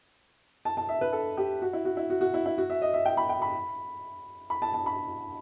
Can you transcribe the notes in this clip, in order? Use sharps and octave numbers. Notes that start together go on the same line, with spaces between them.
A5
A5
E5
B4
A4
G4
F#4
E4
F#4
E4
F#4
F#4
E4
E4
F#4
E5
D#5
E5
G5
B5
G5
B5
B5
A5
A5
B5